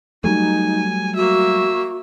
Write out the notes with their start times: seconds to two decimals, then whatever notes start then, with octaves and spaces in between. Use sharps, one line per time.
0.24 F#3 G3 A3 D#4 G#5
1.16 A#3 F#4 E5